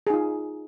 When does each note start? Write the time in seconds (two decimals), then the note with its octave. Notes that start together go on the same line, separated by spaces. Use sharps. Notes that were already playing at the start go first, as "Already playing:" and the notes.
0.07 G#4
0.10 D#4
0.14 F4